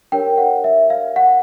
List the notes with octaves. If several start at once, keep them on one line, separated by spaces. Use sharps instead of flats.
D4 G4 A#4 C#5 G5
F#5
E5
F5
F#5